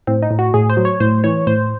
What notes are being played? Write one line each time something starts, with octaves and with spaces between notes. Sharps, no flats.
A2 C4
D#4
A2
F#4
A2 G#4
C5
F#3
C#5
A2 C5
E3 C#5
A2 C5